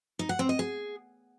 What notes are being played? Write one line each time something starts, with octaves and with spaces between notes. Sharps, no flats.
D#4
F#5
C4
D#5
G#4